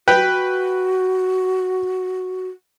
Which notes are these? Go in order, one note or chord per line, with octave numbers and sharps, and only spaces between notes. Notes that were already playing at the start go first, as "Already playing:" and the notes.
F#4 B4 G5